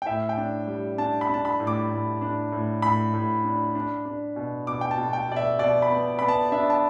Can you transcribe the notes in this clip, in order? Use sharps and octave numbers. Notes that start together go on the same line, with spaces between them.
G5
A2 E5
G5
D4
G3
D4 A5
B5
D4 A5
B5
A2
D6
A2
D4
A2
A2 B5
A2
D4
D4
D4
B2
B2 D6
G5
A5
B2
G5
B2 D5
E5
B2 D5
B5
B3
B3 B5
A5
D4 E5
A5